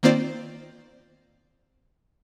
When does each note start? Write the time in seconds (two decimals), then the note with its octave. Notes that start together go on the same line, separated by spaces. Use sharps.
0.03 D#3 A#3 C4 F4 C5 D5